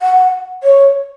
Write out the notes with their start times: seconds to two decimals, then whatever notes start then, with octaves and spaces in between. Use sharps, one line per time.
0.02 F#5
0.63 C#5